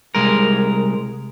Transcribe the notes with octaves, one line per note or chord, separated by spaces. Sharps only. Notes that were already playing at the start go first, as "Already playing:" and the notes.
C2 G#3 A#4